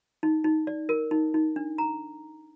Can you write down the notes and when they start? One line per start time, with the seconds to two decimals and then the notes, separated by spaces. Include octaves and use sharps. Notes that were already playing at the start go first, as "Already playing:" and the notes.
0.23 D#4
0.44 D#4
0.67 D5
0.89 A#4
1.11 D#4
1.34 D#4
1.56 D4
1.78 A#5